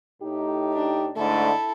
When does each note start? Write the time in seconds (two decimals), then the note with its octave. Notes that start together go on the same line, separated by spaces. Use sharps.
0.22 A2 D#4 G4
0.73 D4
1.16 G#2 D3 A3 E4 A4